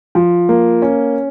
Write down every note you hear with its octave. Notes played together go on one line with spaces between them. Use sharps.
F3
A#3
C#4